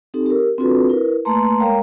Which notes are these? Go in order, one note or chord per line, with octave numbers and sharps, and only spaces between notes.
C4 D#4 G4 A4
G4 A#4
C4 D4 F4 F#4 A4 B4
E4 A#4 B4
A3 A#3 B4 A5 A#5 C6
G#3 A#4 C#5 F5 G5 A#5